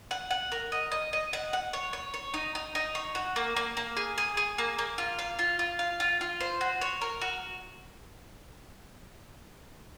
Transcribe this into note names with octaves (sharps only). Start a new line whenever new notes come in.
F#5
F#5
A#4
D#5
D#5
D#5
F#5
F#5
C#5
C#5
C#5
D#4
D#4
D#4
C#5
F#4
A#3
A#3
A#3
G#4
G#4
G#4
A#3
A#3
F4
F5
F4
F4
F5
F4
F4
C5
F#4
C#5
A#4
F#4